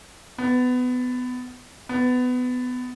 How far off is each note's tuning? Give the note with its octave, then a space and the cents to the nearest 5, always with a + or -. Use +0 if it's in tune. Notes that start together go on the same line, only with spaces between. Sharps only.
B3 +20
B3 +20